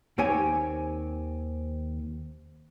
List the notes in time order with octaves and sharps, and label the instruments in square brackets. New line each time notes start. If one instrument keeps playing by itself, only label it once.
[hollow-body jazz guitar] D#2 D#3 C4 G4 C#5 G#5